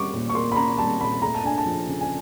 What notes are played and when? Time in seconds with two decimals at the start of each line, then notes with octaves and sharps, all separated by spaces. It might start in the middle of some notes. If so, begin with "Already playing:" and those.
Already playing: G3 A#3 C#4 C#6 D6
0.13 A#2
0.29 C#6
0.35 A#3 C6
0.52 B5
0.56 C#4 A#5
0.78 G3 A5
1.00 A#2 B5
1.22 A3 A#5
1.34 A5
1.44 D4 G#5
1.57 A5
1.66 F3
1.87 C#3
2.01 G#5